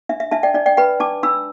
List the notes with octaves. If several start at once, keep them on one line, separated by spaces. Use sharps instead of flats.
D4 E5
E5
D4 E5 A5
D5 G5
D4 D5
D5 G5
B4 G5 B5
D4 A5 D6
D4 B5 E6